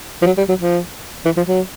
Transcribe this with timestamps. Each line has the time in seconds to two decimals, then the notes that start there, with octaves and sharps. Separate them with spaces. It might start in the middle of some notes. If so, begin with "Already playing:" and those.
0.22 F3
0.26 F#3
0.38 G3
0.49 F#3
0.59 F3
1.25 E3
1.37 F3
1.47 F#3